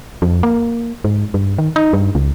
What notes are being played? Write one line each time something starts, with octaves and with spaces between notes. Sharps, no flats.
F2
A#3
G#2
G2
D#3
D#4
G2
C#2